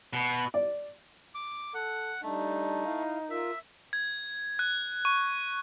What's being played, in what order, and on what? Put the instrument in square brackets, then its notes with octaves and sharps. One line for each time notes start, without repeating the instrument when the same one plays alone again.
[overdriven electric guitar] B2
[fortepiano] D5
[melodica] D6
[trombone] A4 [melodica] F#5
[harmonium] G3 D4 [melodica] A3 [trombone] D#4
[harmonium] E4 F5
[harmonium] F4 A#4 [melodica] E5
[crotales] G#6
F#6
C#6